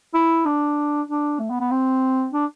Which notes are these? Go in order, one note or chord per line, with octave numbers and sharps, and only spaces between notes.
E4
D4
D4
A3
B3
B3
C4
D4